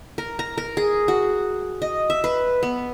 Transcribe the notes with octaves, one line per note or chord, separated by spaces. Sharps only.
A#4
A#5
A#4
G#4
F#4
D#5
E5
B4
B3